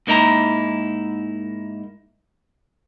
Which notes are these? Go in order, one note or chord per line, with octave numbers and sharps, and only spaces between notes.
G#2 A#3 D#4 E4 A#5